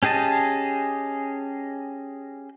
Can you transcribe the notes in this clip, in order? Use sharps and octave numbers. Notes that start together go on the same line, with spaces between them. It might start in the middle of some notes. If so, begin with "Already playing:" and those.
C#4 G4 G#4 D#5 A5